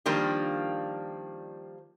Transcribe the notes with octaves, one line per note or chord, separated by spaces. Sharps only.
D#3 F3 G3 A#3 D4 F4